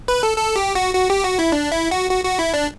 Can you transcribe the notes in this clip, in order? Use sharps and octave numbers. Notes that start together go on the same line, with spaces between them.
B4
A4
A4
G4
F#4
F#4
G4
F#4
E4
D4
E4
F#4
F#4
F#4
E4
D4